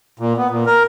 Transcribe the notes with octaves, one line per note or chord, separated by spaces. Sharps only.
A#2
B3
A#2
A#4